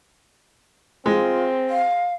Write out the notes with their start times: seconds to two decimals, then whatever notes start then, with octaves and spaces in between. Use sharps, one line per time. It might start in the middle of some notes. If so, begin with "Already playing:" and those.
1.06 G#3 C4 F4
1.69 F5